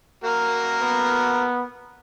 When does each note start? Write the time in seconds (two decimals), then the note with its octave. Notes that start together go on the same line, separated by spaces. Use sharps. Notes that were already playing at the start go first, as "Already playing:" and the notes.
0.24 A#3 F#4 A#4
0.82 B3